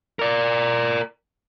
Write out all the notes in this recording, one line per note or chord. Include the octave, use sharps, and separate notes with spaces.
A#4 D5